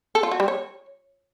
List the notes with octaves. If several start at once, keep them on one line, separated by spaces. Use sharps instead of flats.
A4
F4
F#4
G3
C#5